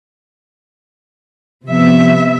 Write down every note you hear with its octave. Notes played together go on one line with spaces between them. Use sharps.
C3 F3 B3 E5